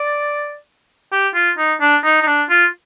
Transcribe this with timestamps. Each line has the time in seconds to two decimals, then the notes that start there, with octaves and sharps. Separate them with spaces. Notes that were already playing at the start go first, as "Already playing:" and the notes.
Already playing: D5
1.12 G4
1.34 F4
1.58 D#4
1.81 D4
2.04 D#4
2.22 D#4
2.27 D4
2.49 F4